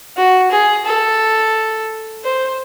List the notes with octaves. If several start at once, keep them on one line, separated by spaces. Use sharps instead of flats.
F#4
G#4
A4
C5